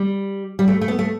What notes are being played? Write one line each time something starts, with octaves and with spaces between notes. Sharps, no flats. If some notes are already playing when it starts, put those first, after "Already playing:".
Already playing: G3
G3
A3
A3
B3
A3